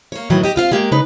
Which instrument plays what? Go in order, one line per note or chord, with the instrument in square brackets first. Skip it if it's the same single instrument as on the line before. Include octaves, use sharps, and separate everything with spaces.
[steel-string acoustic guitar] A#3 C#5
A2 D#3 E3 F#3
G4 D#5
C4 F4 F5
G#3 A#3 G4
C#3 D#4 B4